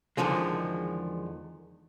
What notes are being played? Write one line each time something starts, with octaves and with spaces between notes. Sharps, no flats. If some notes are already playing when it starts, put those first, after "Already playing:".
E2 D3 D#3 F3 G#3